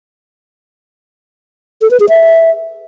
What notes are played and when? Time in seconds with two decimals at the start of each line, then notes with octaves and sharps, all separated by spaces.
1.82 A4
1.91 B4
2.00 G#4
2.09 E5